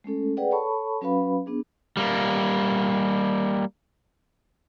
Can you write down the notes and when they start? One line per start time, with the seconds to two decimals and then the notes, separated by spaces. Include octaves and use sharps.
0.04 G#3 A3 C#4 A4
0.37 G#4 B4 D5 F#5 G5
0.51 A4 C#5 A5 B5 C#6
1.01 F#3 C#4 F#4 B4 F5 B5
1.46 B3 D4 G#4
1.97 G3 A#3